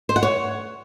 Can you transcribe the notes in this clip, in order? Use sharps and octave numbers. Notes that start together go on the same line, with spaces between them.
C5
F#5
C#5